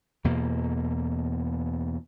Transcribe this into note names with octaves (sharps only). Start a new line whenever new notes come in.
E2 B2 A#3